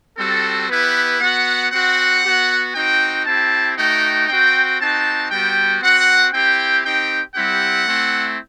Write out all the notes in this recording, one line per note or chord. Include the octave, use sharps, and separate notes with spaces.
G3 C4 F#4 A4
B3 E4 G4 B4
B3 F#4 F#5
C4 F#4 F#5
B3 F#4
C4 D#4 F#4 G5
C4 E4 G4 A5
A3 D#4 F#4 G5
C4 F#4 G5
C4 D#4 F#4 A5
G3 B3 F#4 G5
C4 F#4 F#5
C4 E4 G4 G5
C4 D#4 G4 G5
G3 C4 E4 G4 F#5
A3 C4 E4